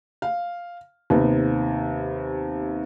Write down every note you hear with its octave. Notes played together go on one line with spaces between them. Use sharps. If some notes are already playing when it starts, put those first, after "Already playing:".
F5
D#2 C3 B3